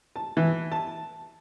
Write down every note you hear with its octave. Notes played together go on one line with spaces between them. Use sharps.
A5
E3
A5